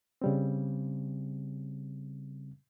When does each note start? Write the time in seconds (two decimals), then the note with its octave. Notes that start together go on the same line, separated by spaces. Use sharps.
0.22 C#3 G3 C4